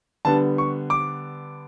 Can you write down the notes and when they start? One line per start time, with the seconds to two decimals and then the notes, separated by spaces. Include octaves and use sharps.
0.25 D3 G3 B3 A5
0.58 C#6
0.90 D6